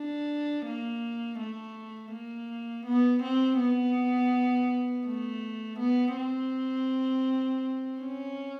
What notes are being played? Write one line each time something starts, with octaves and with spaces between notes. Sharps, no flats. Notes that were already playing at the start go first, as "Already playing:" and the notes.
Already playing: D4
A#3
A3
A#3
B3
C4
B3
A3
B3
C4
C#4